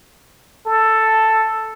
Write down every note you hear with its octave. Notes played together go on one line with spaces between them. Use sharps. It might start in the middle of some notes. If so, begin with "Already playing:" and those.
A4